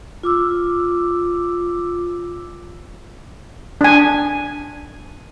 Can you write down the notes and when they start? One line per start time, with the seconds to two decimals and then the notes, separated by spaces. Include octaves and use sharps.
0.23 F4 D6 E6
3.81 D4 G#5